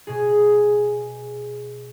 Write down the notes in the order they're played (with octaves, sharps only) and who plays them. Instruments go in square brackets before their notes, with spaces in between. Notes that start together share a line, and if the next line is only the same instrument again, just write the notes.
[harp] B2 G#4